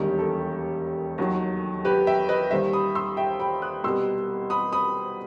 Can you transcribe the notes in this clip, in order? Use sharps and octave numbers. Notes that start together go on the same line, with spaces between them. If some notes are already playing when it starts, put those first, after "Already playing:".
Already playing: E1 D#2 D#3 G3 G4
A4
D#2 D#3 F#3
G4 B4
E5 G5
B4 D#5
D#2 D#3 G3 C5 E5
B5 D#6
C6 E6
E5 G5
G5 B5
D#6 F#6
C2 B2 G3 C6 E6
B5 D#6
B5 D#6